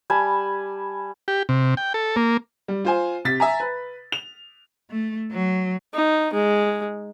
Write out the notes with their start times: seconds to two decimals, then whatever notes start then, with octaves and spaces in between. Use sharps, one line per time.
0.10 G3 G#5 A5 B5
1.28 G4
1.49 C3
1.77 G5
1.94 A4
2.16 A#3
2.68 G3
2.85 F4 C5 G#5
3.25 C3 A6 B6
3.40 E5 G#5 A#5
3.60 B4
4.12 F7
4.91 A3
5.32 F#3
5.94 D#4
6.33 G#3